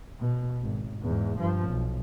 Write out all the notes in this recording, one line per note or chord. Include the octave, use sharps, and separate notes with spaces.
B2
G#1
E2 G#2
G2 F3
B1